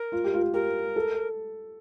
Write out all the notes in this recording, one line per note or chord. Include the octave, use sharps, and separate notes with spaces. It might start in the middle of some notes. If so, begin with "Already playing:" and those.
Already playing: A#4
F4
G4
F4
G4 A#4
A4